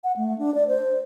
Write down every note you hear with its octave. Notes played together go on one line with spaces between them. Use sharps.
F#5
A3
D4
D5
C5